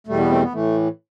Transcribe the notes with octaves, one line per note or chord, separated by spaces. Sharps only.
E2 B2 G3 A3
B3
A3 C4
B3
A2 E3 A3